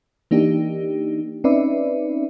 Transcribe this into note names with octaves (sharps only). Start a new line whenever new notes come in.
E3 A#3 D4 D#4 G4
C4 C#4 D#4 B4 D5 E5